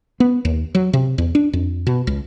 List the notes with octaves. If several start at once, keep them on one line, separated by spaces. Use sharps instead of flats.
B3
D#2
F#3
C3
E2
D4
F2
B2
C#2